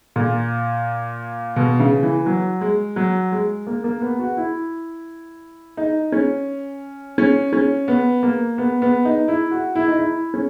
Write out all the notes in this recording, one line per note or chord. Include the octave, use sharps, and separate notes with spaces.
A#2
B2
C#3
E3
F#3
G#3
F#3
G#3
A#3
A#3
B3
F#4
E4
D#4
C#4
C#4
C#4
B3
A#3
B3
B3
D#4
E4
F#4
E4
D#4
E4
C#4